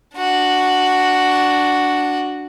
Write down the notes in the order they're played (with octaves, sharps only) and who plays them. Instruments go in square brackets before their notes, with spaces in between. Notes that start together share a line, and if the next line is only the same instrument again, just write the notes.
[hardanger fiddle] D4 F#4